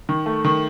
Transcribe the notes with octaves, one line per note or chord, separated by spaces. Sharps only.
D#3
A3
D#3